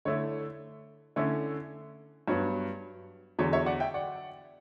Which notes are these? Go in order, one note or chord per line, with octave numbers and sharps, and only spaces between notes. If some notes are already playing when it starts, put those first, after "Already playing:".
D3 A3 E4 C#5
D3 A3 C#4 E4 C#5
G2 F#3 B3 C#5
E2 D3 F#3 C#5
C#5 E5
D5 F#5
E5 G5
D5 F#5